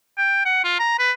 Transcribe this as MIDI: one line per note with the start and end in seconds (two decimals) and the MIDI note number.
0.18 0.42 79
0.46 0.63 78
0.64 0.78 65
0.79 0.98 82
0.99 1.12 71